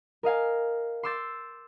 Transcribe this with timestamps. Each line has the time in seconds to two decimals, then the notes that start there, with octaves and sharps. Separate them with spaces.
0.23 A#4 D#5 F5 G#5
1.03 C6 D6 E6 G6 A6